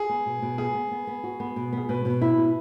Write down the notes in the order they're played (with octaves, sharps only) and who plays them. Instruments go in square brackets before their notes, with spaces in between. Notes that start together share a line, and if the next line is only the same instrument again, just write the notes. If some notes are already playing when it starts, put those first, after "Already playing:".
Already playing: [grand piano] G#4
[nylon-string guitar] B3
B2
B2
[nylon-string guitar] B3 [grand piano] G#4
[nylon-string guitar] B3
B3
B3
F#4
B3
B2
[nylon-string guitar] B3 [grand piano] G#4
[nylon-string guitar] B2 [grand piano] B4
[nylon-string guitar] B2
E4
B2